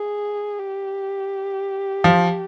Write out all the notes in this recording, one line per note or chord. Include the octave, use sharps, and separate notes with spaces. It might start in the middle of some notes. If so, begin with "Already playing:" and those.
Already playing: G#4
G4
F3